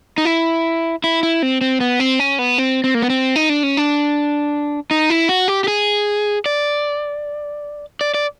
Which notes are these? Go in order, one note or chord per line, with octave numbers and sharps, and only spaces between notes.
D#4
E4
E4
E4
C4
C4
B3
C4
C#4
B3
C4
C4
A#3
B3
C4
D#4
D4
C#4
D4
D#4
E4
F#4
G4
G4
G#4
D5
D5
D5